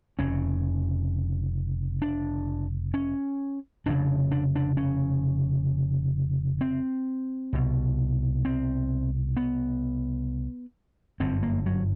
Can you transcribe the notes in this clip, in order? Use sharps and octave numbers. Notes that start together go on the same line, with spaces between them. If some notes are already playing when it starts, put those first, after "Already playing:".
F1 F2 C#3 C#4
D4
C#4
F1 F2 C#3 D4
D4
D4
C#4
C4
C2 B2
C4
B3
G1 F#2 D3 C4
A#3
F#3